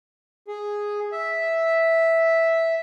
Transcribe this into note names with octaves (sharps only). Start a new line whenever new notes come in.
G#4
E5